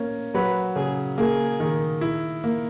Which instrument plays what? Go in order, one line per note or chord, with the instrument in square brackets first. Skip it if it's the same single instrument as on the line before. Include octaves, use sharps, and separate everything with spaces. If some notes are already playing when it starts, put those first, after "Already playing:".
Already playing: [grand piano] A#3 C#4
[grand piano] F#3 [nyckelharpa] B4
[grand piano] C#3 [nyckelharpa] G#4
[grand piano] A#3 [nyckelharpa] G#4
[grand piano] D#3
E4
A#3